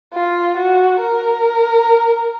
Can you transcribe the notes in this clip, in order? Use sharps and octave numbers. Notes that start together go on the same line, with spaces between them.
F4
F#4
A#4